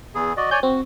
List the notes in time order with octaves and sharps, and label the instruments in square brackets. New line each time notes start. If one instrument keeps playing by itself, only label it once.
[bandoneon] E2 G#4
F#4 D5 D#5
[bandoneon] C#5 D5 G#5 [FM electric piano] G6
[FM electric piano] C4 [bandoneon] F#4